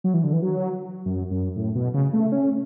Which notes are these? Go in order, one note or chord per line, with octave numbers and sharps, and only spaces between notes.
F#3
E3
D3
E3
F#3
F#2
F#2
A2
B2
C#3
A3
C#4